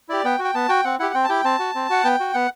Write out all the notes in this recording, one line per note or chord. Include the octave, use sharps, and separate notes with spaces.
E4 G4 D5
B3 G5
F#4
G5
B3 A5
F#4 G5
C4 F#5
E4 G4 F#5
C4 G5
A5
E4 G4 G5
C4 A5
F#4
C4
F#4 F#5
B3 G5
F#4
B3 F#5